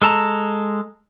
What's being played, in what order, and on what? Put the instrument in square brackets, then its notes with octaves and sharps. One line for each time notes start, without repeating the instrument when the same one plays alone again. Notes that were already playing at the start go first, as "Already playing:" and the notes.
[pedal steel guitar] G#3 A4 A5 A#5